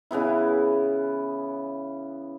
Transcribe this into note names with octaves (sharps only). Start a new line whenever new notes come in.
C#3 E3 B3 E4